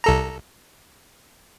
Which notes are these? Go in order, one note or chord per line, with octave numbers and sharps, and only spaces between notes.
C2 A4 A#5